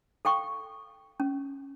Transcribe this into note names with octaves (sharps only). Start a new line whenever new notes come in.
A4 F5 G5 C#6
C#4